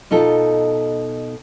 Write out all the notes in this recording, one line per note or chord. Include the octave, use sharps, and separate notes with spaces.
B2 D#4 F4 A4